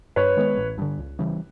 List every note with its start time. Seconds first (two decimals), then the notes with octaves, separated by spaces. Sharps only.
0.16 G2 B4 C#5
0.37 D#3 G#3 B3
0.58 A1
0.78 G2 D3
0.98 C#2
1.19 C#3 E3 G3